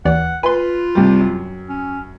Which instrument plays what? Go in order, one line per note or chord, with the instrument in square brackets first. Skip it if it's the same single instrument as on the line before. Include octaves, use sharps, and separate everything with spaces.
[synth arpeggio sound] D#2 E3 D5 [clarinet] F#5
[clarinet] F4 [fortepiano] B4 [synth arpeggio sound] G#5 C6
[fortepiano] C2 G3
F#2
[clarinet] C#4